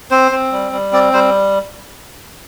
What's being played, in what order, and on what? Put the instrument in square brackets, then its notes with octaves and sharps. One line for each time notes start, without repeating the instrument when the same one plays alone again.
[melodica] C4 C5
C4
G3
G3
C4 D5
G3 C5